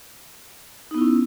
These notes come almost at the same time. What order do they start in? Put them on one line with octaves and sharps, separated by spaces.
D#4 B3 E4 C#4